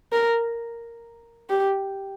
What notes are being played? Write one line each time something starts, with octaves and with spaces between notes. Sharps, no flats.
A#4
G4